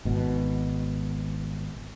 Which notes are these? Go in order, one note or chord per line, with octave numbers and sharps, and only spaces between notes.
G#1 B2